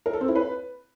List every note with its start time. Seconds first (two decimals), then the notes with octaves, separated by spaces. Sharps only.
0.06 A#4
0.13 A4
0.21 C4
0.28 E4
0.35 B4